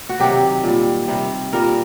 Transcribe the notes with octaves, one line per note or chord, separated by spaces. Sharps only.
F#4
C3 D#3 F#3 G4
A#2 G3
C3 G3
A#2 G3 A#4